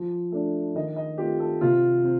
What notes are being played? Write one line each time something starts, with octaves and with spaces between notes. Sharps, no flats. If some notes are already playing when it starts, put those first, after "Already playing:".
Already playing: F3
A3 D4
D#3 D#5
D#5
A3 C4 F4 G4
A4
C3 F4
C4